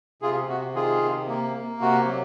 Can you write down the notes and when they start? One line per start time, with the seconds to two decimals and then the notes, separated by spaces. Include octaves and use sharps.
0.22 C3 F4 G#4
0.49 C3 F#4
0.75 D#3 F4 G#4
1.02 C3
1.28 A#3
1.55 A#3
1.81 C3 F#4
2.07 F#3